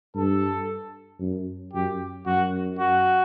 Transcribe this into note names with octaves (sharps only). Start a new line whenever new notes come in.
G2 A4
F#2
F#2 G4
F#2 F#4
F#4